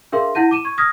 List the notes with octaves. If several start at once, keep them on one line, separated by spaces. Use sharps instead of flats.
D4 G#4 A#4 E5 F5 C6
E4 F#5 A5 G6 A#6 D#7
D6 D#7 E7
C#6 G#6
D#6 F6 G#6 A#6 B6